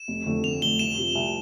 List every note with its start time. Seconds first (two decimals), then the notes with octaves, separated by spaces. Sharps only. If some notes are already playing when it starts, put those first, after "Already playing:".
Already playing: E7
0.08 F1
0.26 F2 D3 A3
0.44 F1 F7
0.61 F2 D3 A3 G7
0.79 C2 E7
0.98 C3 F3
1.15 C2